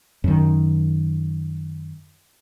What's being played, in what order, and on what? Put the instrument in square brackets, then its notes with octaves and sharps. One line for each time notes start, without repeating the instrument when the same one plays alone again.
[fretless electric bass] F#2 D#3